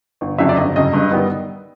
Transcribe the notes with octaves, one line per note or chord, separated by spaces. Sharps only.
G1
F2 C#3 F#3 E5
D5
G1 D#5
F2 C#3 F#3 D#5
G2
D#3 G3 B3